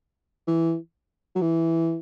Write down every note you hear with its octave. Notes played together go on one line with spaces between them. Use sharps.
E3
F#3
E3